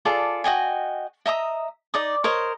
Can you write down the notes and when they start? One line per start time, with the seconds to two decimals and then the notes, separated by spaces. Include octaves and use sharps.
0.05 F4 G#4 A4 D5
0.44 F#4 D#5 G5 G#5
1.26 D#5 E5 A#5 D#6
1.94 D#4 D5 D#6
2.24 A#4 C5 C#5 D#5